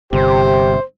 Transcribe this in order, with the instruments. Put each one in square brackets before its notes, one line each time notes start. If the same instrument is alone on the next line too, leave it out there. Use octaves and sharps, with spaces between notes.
[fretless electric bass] G1 [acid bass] C3 [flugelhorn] G4 [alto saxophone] C5